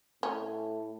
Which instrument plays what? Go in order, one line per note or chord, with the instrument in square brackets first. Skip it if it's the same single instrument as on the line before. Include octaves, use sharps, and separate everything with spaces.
[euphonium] A2 [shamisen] C#4